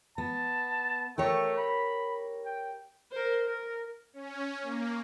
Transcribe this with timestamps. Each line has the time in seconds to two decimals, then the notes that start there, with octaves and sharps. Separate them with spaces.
0.18 B3 A5
1.18 A3 G4 A#4 C#5
1.58 B5
2.46 G5
3.12 A#4 C5
3.47 A#4
4.13 C#4
4.62 A#3